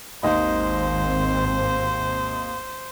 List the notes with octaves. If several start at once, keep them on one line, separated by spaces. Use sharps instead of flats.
G#1 D#2 C4 D#4 C5 D#5